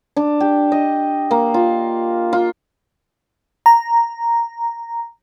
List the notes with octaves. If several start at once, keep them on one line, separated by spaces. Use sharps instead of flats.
D4
G4
D#5
A#3
F4
F4
A#5